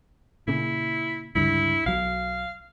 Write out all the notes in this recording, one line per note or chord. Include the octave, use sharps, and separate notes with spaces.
A#2 C#3 E4
C#2 G2 D3 E4
B1 F#3 F5